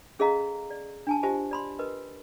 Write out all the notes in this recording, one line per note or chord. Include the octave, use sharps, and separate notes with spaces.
C#4 G#4 A4 D#5 F5 A#5
D5
D4 G#5 A5
F4 G4 C5 D#5 G#5 A5
D5 B5 C6
A#4 B4 D#5